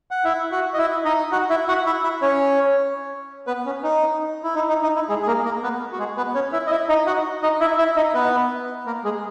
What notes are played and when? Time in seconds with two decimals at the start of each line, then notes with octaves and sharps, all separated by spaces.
0.11 F#5
0.25 E4 E5
0.52 F#4 F#5
0.74 D#5
0.78 E4 E5
1.05 D#4 D#5
1.32 F#4 F#5
1.50 E4 E5
1.68 F#4 F#5
1.86 E4 E5
2.04 E4 E5
2.22 C#4 C#5
3.47 B3 B4
3.66 C#4
3.83 D#4
4.43 E4
4.55 D#4
4.69 D#4
4.83 D#4
4.95 E4
5.09 G#3 G#4
5.22 G#4
5.27 A#3 A#4
5.45 A#3 A#4
5.63 B3 B4
5.92 F#4
5.99 G#3 G#4
6.17 B3 B4
6.35 C#4 C#5
6.53 E4 E5
6.67 D#5
6.71 E4 E5
6.89 D#4 D#5
7.07 F#4 F#5
7.43 D#4 D#5
7.60 E4 E5
7.78 E4 E5
7.96 D#4 D#5
8.14 B3 B4
8.86 A#3 A#4
9.04 G#3 G#4